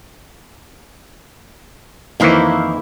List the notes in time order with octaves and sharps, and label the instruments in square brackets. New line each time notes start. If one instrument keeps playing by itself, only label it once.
[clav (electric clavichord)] F2 D#3 E3 [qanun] A#3 E4 C5